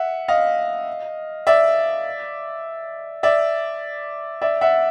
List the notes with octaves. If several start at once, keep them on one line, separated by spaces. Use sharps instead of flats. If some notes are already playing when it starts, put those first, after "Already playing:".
Already playing: E5 F#5
D#5 F5
D5 E5
D5 E5
D5 E5
E5 F#5